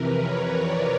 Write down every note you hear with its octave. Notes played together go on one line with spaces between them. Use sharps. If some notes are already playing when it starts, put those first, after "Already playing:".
Already playing: F2 C3 E3 A#4 B4
C#5
D5